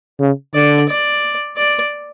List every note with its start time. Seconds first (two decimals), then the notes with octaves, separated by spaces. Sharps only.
0.20 C#3
0.54 D3 D5
0.88 D5
1.57 D5